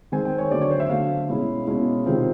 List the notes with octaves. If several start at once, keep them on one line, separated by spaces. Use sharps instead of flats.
D#3 G#3 C4 G#5
G5
C#5
D3 F#3 A3 D5
C#5
C5
E5
D3 F#3 A3 F5
B2 G#3 C#4 E4
B2 G#3 C#4 E4
C3 D#3 G#3 C4 F4